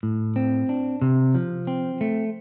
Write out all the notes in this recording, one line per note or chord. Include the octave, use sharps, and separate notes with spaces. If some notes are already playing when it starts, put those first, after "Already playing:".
A2
C4
D4
C3
F3
C4
A3